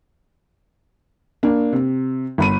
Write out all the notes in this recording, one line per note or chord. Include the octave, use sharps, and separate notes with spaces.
A#3 D4
C3
G1 B5 D#7